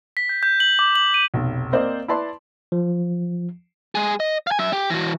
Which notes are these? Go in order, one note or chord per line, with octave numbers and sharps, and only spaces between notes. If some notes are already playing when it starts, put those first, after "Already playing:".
B6
G6
G6
F#7
D6
F#7
D#7
F1 B1
A#3 C4 C5 D5 D#5
E4 B4 D5 A5 C6
F3
G#3 G#4
D#5
F5 G#5
F#3 E5
G4
E3 F#4